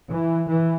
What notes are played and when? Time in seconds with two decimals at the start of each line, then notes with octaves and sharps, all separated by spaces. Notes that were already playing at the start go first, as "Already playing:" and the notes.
0.12 E3
0.48 E3